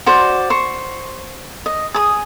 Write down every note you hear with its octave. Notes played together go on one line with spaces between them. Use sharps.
F#4 C5 D5
C5 C#6
D#5
G#4 D#6